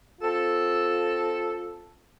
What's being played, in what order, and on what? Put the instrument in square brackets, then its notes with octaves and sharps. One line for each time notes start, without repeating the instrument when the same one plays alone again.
[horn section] C4 F4 A4